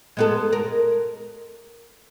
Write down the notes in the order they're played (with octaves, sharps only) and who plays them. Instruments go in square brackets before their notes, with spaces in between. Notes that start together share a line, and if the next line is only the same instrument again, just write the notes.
[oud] G#3 B3 A4
A#4